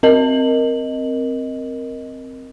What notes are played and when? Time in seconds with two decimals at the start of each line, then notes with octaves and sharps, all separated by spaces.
0.03 C4 A#4 D#5 F#7